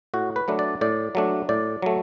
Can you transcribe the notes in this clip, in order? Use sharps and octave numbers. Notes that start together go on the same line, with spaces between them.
A2 F#4
B4
F#3 A3 D4
D5
A2 D5
F#3 A3 D4
A2 D5
F#3 A3